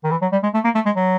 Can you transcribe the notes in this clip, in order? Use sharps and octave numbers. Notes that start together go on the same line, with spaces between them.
D#3
E3
F#3
G3
G#3
A3
A#3
A3
G#3
F#3